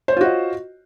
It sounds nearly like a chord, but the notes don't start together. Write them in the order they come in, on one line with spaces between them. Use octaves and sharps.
C5 C#5 F4 F#4 D#5